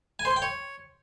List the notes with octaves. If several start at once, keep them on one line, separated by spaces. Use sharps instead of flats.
G#5
C5
C6
G5
C#5